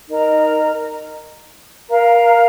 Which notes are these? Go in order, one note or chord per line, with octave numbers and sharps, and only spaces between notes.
D#4 A#4 D#5 A#5
A#4 F5 A#5